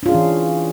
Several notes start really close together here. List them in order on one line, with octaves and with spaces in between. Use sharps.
D4 F4 G#4 C#4 E3